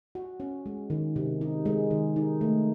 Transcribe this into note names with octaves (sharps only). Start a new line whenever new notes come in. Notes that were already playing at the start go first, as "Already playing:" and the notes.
F#4
C#4
G#3
D#3
C3
D#4
G#3
D#3
D#4
A3